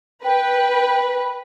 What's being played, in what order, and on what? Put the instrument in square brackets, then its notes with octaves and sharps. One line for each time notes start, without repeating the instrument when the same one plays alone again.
[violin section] B4 [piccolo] G5